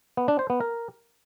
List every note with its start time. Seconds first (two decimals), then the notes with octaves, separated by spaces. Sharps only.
0.17 B3
0.28 D4
0.39 C5
0.50 B3
0.61 A#4